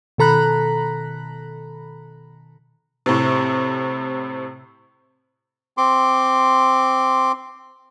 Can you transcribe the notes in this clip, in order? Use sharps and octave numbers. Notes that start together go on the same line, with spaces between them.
B2 D#3 A4 A#5 B5 F#6
A2 C3
C4 C6 D6